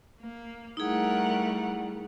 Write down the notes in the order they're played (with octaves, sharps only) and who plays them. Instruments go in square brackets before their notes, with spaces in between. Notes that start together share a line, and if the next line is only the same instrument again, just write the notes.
[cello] A#3
[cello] G3 A3 [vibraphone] D#4 E4 G#4 [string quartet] A#4 F#5